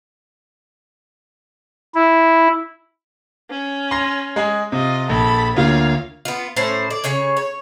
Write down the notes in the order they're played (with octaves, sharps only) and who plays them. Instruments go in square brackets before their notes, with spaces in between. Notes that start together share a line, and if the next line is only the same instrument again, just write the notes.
[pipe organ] E4
[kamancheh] C#4
[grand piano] C6 A#6
G#3 G#4
[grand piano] C3 [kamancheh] F4 D#5
[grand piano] A#1 [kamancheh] A4 B5
[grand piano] D2 A#3 F4 [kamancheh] C#5 F5
[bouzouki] B3 F4
A2 C#4 C5
D5
C#3 C#4 C#5 G#5
C#5